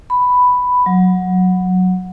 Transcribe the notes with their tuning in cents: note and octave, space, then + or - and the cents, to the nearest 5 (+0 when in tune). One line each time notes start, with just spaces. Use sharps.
B5 +5
F#3 -10